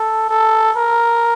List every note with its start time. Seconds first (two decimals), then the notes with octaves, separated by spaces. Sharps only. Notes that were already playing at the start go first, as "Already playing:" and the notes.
Already playing: A4
0.29 A4
0.76 A#4